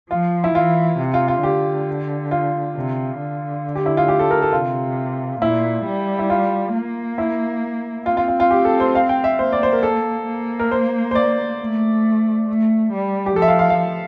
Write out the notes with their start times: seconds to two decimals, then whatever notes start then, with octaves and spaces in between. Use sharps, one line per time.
0.10 F3 F4
0.44 E4
0.55 E3 F4
0.99 C3
1.14 F4
1.28 F4
1.43 D3 G4
2.31 F4
2.76 C3
3.20 D3
3.75 G4
3.86 E4
3.97 F4
4.08 G4
4.19 A4
4.31 A#4
4.42 A4
4.53 C3 F4
5.41 A#2 E4
5.85 G3
6.19 E4
6.30 F4
6.74 A#3
7.18 E4
8.06 C4 F4
8.17 F4
8.28 F4
8.40 F4
8.51 G4
8.65 A4
8.80 C5
8.95 F5
9.09 G5
9.24 E5
9.39 A#3 C5
9.53 D5
9.63 C5
9.73 A#4
9.83 A4
10.28 A#3
10.60 A#4
10.71 C5
11.11 C5
11.15 D5
11.60 A3
12.49 A3
12.92 G3
13.26 G4
13.36 F3 A4
13.42 E5
13.48 F5
13.59 F5
13.70 F5